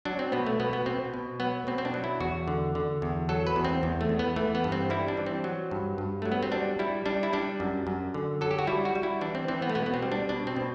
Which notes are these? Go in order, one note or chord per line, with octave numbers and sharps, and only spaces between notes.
F#3 D4
C4
B2 B3
A3
B2 B3
B3
B2 C4
B2
F#3 B3
B2 C4
C4
D4
F#3
E4
E2 F#4
D3
D3
E2
F#3 A4
B4
E2
C4
E2
A3
E2
B3
E3 A3
B3
G2
C4
G3 E4
D4
E3
C4
F#3
G2
G2
F#3 A3
B3
C4
G3 D4
G3 E4
G3 D4
E4
G3 D4
F#2
F#2
D3
F#3 A4
G4
F#4
G3 E4
F#4
G3
E4
E3 D4
C4
E3 C4
B3
A3
B2 B3
B3
C4
G3
D4
B2 D4
C4
B2